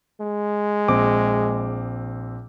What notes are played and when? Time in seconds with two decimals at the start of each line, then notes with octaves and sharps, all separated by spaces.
0.21 G#3
0.88 A#1 C4 D6